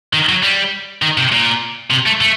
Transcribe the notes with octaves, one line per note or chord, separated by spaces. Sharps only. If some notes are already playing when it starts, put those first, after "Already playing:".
D#3
F#3
G3
D#3
C3
A#2
C3
A3
A3